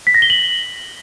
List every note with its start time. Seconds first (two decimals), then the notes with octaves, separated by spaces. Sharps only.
0.07 B6
0.14 A#6
0.22 G7
0.30 F#7